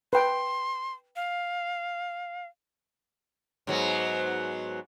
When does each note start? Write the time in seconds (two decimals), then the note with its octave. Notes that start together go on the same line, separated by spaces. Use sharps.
0.13 B4 G5 C6
1.16 F5
3.67 G#2 F#3 B3